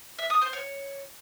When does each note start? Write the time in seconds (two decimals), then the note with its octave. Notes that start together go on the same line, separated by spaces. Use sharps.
0.19 E5
0.30 D#6
0.41 C5
0.53 C#5